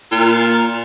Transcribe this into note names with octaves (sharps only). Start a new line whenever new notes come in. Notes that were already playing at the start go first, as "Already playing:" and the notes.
A#2